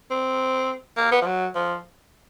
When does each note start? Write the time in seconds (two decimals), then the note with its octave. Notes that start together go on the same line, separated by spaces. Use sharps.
0.11 C4
0.97 A#3
1.12 B3
1.22 F3
1.26 F#3
1.55 F3